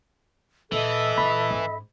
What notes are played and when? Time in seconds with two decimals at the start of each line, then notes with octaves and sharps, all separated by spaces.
0.72 A#2 E3 A4 D#5 E5
1.18 F#2 A#2 B5
1.51 G#2 C#4